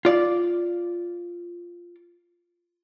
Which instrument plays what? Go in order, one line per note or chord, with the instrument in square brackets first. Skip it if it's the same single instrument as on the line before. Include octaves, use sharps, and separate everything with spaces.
[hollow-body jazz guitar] F4 D5